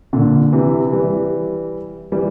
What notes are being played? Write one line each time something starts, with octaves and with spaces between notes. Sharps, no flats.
A#2 D3
C3 E3
E3 G3
E3 G3